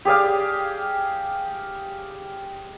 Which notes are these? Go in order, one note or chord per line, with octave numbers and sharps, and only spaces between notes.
G4 G#4 D5 F5